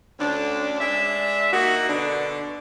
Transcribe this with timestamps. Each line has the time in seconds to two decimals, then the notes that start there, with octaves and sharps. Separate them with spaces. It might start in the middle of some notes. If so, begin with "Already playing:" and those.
0.19 D2 D3 C#4 D4
0.80 G#3 D4 E5
1.52 A#3 D#4 F#4
1.89 B2 D3 D4